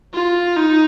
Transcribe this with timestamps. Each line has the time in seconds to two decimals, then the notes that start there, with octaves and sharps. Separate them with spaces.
0.13 F4
0.57 D#4